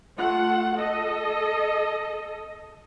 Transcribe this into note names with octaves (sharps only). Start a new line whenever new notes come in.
A3 F4 F#5
A4 D#5